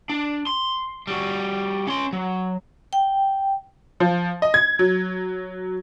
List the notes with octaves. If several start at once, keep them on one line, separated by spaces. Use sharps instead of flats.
D4
C6
G3 F#4
C#4 C6
F#3
G5
F3
D#5
G#6
F#3